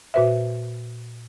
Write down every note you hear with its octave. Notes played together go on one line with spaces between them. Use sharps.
A#2 F#4 B4 C5 E5